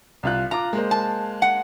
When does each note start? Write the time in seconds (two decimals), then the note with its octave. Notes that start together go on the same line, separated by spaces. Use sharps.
0.23 C2 F4 F#6
0.51 F4 A#5 D6
0.73 G#3 A#3 C5
0.91 A5
1.42 F#5